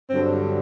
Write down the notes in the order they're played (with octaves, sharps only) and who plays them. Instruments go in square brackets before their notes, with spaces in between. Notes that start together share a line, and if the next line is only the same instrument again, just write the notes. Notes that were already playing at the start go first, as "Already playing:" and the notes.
[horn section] G2 D3 F#3 C4